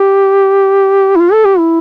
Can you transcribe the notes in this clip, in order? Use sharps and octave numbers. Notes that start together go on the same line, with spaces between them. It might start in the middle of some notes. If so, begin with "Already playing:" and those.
Already playing: G4
E4
F4
A4
G4
E4